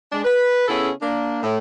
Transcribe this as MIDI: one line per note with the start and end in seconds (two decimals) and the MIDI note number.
0.12 0.22 56
0.12 0.22 62
0.25 0.67 71
0.68 0.90 49
0.68 0.90 59
0.68 0.90 61
0.68 0.90 64
0.68 0.90 68
0.68 0.90 69
1.02 1.42 58
1.02 1.42 62
1.43 1.58 45